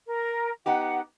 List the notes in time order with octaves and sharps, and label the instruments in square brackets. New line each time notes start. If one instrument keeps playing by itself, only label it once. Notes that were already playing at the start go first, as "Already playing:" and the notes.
[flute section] A#4
[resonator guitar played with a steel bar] B3 D#4 G4 [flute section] F#5